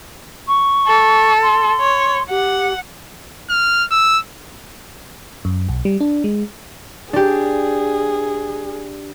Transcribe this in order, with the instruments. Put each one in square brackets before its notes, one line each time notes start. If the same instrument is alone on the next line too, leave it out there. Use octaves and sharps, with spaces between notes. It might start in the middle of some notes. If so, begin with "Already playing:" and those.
[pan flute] C#6
[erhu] A4
[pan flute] C6
[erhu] C#5
[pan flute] G4 [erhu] F#5
[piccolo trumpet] F6
E6
[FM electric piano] F#2
B1
G3
D4
G#3
[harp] D4 G4 [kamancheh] G#4